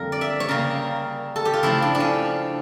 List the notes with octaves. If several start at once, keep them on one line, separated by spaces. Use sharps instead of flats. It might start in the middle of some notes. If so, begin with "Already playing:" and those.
Already playing: F2 D3 G3 A#3 A#4
D5
E5
C#5
C#3 G3 A#3 A#4
A4
G4
F4
C#3 F3 A3 E4
D4
D4
C#4